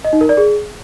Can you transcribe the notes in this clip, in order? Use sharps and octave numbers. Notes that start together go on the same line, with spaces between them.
D#5
D#4
A#4
D5
G#4